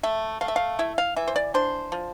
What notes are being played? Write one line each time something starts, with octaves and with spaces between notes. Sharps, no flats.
A3 E5
A3 F5
E5
F5
E4 E5
F5
E3 E5
C5
D5
D4 C5
F3